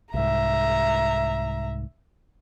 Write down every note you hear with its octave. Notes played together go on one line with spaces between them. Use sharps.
C2 G#2 E5 A#5